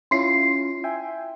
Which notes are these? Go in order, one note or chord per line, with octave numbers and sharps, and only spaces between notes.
C#4 E4 F4 C6 C7
E5 G5 G#5